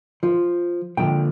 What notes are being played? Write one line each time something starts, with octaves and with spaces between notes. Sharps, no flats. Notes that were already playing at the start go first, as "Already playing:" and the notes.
F3
A#2 D3 F3 G5